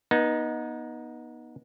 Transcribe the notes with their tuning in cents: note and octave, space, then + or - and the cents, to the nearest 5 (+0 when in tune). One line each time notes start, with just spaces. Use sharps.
B3 -30 D#4 +0